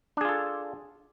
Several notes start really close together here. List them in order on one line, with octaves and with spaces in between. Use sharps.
D4 G#4 F4 A4